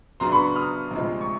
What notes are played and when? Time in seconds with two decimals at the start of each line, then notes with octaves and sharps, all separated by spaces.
0.20 C#3 F#3 B3 D4 A#5 C6
0.32 B5 C#6
0.56 D#6 F6
0.91 D2 C3 F3 G#3
1.21 C#6